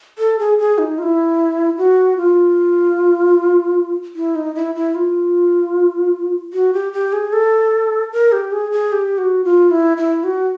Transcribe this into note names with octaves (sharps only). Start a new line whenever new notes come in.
A4
G#4
G#4
D#4
F4
E4
F#4
F4
E4
D#4
E4
E4
F4
F#4
G4
G4
G#4
A4
A#4
G4
G#4
G#4
G4
F#4
F4
E4
E4
F#4